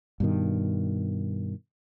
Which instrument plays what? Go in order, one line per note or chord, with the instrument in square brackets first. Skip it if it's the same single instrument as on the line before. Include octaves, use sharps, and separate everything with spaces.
[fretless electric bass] G2 B2 D#3